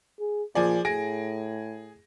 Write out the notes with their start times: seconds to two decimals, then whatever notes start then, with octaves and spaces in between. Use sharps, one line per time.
0.20 G#4
0.55 A#2 F3 G#4 D5
0.85 A2 G#4 A#6 D7